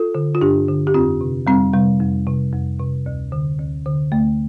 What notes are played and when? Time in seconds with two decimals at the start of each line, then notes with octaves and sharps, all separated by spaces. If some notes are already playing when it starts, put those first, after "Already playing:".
Already playing: F4 A4
0.15 D3
0.35 F4
0.41 G2 D4 G4
0.68 D3
0.87 G4
0.94 F2 C4 F4
1.21 C3
1.47 F2 G3 C4
1.73 C3 G3
2.00 F2
2.27 C3
2.53 F2
2.79 C3
3.06 D2
3.32 D3
3.59 D2
3.86 D3
4.11 D2 A3